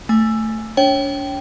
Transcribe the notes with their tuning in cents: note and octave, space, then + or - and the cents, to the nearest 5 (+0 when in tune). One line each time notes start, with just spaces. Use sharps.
A3 +10 G#5 +0
D4 -45 C#5 -20 G5 -5